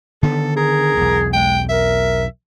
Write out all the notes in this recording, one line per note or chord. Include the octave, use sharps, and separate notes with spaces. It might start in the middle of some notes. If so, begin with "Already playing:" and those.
D3 D#3 B3 A4
G#4 A#4
B1 E2
G#3 G5
A#4 E5